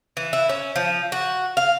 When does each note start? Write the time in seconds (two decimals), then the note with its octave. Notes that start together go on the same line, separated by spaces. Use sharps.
0.17 E3
0.33 E4
0.49 C#4
0.76 F3
1.12 F#4
1.57 F5